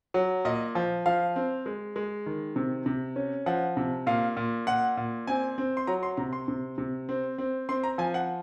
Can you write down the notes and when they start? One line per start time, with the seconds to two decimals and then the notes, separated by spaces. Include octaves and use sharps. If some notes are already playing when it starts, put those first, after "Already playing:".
0.14 F#3
0.45 A#2 D#5
0.75 F3
1.06 F3 F5
1.36 C4
1.66 G#3
1.96 G#3
2.26 D#3
2.56 C3
2.86 C3
3.16 C#4
3.46 F3 F#5
3.77 C3
4.07 A#2 F5
4.37 A#2
4.67 A#2 F#5
4.97 A#2
5.27 C4 G#5
5.58 C4
5.77 C6
5.87 F#3 A#5
6.03 C6
6.17 C3 A#5
6.33 C6
6.48 C3
6.78 C3
7.09 C4
7.38 C4
7.69 C4 C6
7.84 A#5
7.98 F3 G#5
8.14 F#5